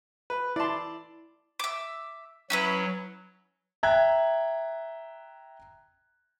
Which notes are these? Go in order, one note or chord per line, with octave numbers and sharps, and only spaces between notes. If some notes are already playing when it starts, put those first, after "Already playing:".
B4
E4 D5 A5 C6
E5 D6
F#3 C#4 E4 B4
E5 G5 A#5 F#6 G#6